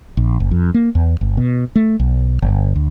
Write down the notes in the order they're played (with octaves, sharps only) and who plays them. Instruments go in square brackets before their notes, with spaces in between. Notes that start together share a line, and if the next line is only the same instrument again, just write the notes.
[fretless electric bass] A#1
F#1
F2
A#3
E2
G1
B2
A3
B1
G1
D2